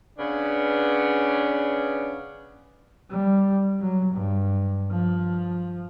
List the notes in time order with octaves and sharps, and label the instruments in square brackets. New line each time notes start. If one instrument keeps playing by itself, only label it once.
[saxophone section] C#3 B3 C#4 D4 B4
[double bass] G3
F#3
G2
F3